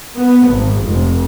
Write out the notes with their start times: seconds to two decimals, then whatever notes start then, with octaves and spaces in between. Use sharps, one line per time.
0.16 B3
0.47 G#1
0.85 F1